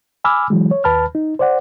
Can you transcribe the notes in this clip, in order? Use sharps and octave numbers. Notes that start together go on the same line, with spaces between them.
G#5 B5 D6 E6 F6
E3 F#3 G#3
C#5
D#2 B4 A5 B5 F6
D#4
C5 D5 F#5